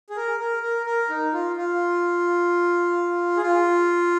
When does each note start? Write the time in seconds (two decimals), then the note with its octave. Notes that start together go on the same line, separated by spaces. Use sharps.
0.10 G#4
0.17 A#4
0.40 A#4
0.63 A#4
0.86 A#4
1.10 D#4
1.33 F4
1.56 F4
3.37 G#4
3.42 F4